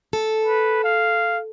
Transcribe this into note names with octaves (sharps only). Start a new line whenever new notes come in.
A4
B4
F5